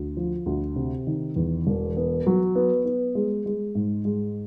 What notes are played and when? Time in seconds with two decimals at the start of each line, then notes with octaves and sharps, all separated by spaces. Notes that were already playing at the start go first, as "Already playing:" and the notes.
Already playing: D2
0.17 F3
0.46 D2
0.76 C3
1.07 D#3
1.36 E2
1.67 E1
1.97 B3
2.27 F#3
2.55 B3
2.85 B3
3.15 G#3
3.46 G#3
3.75 G#2
4.05 G#3